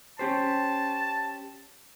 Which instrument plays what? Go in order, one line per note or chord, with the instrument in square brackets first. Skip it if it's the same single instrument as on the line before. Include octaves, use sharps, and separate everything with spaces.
[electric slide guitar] C#4 G4 C5 [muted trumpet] A5